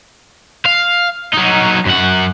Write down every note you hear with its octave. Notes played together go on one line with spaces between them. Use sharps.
F5
F#3 D#4
F#2 F#5